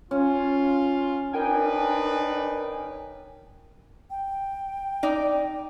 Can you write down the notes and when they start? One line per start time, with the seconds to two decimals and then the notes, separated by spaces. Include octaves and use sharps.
0.11 C#4 F4
1.33 D4 D#4 A#4 B4 G5 G#5
4.10 G5
5.03 D#4 D5